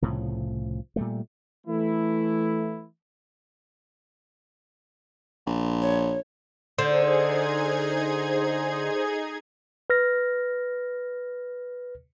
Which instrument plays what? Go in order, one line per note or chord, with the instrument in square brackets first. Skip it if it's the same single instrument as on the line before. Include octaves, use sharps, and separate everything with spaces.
[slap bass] C2 A2 C#3 F3
A#2 G3 A3
[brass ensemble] E3 A3 E4
[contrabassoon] A#1
[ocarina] C#5
[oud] D3 [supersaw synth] D#4 G#4 G#6 [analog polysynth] C5
[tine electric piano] B4 F6 A#6